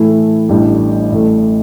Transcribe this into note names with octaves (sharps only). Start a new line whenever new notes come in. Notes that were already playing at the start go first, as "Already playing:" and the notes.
Already playing: A2 E3 A3 E4
A1 A2 G3 D4
A1 A2 A3